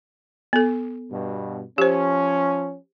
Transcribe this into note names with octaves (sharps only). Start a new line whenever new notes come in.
B3 A4
G2 B2
F3 C#4 G4 C5